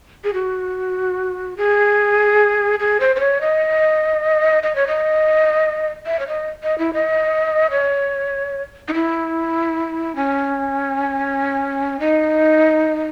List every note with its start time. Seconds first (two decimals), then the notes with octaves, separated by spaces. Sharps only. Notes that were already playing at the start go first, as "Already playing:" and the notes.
0.24 G#4
0.34 F#4
1.57 G#4
2.80 G#4
3.00 C5
3.16 C5
3.20 C#5
3.41 D#5
4.63 D#5
4.76 C#5
4.87 D#5
6.06 E5
6.19 C#5
6.28 D#5
6.64 D#5
6.78 E4
6.94 D#5
7.71 C#5
8.88 D#4
8.94 E4
10.16 C#4
12.00 D#4